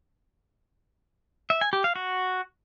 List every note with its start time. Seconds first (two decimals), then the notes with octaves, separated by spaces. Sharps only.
1.50 E5
1.61 G#5
1.73 G4
1.84 F5
1.96 F#4